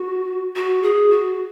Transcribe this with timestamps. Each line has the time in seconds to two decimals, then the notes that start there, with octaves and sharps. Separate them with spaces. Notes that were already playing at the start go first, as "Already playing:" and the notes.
Already playing: F#4
0.56 F#4
0.83 G#4
1.10 F#4